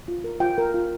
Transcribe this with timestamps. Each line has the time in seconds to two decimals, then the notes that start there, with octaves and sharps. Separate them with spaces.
0.08 F4
0.24 A#4
0.40 F4 G5
0.58 A#4
0.74 F4